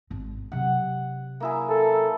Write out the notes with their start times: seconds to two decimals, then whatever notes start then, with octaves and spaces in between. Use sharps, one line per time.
0.10 G#1 G#3
0.52 C3 F#3 F#5
1.40 A#3 E4 G#4
1.69 A4